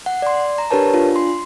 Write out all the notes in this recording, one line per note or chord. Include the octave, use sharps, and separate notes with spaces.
F#5
D5 C6
A#5
D4 G4 A#4 B4 C#5 A5
D4 F4
C6